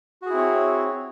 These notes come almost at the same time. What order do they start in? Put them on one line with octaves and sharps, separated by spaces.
F#4 G#4 E4 C4 C#5